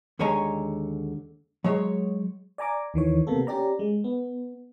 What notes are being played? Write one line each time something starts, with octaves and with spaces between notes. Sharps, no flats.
D#2 D3 G#3 C#5 G#5 A#5
F#3 G#3 C#5
D5 G#5 A#5 D6
D#2 D#3 E3 C#5
C3 A#3 B3 A4
C#4 G4 D5 A#5
G#3
B3